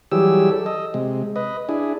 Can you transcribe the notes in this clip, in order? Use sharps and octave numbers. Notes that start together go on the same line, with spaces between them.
E3 F#3 G3 G4 G#4 E6
A4
D#5
C3 G#3
B4 D#5
D4 E4 G#4